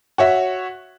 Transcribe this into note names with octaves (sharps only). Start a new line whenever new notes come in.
F#4 C#5 E5